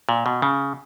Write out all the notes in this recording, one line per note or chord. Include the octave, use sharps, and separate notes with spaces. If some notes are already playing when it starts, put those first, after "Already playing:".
A#2
B2
C#3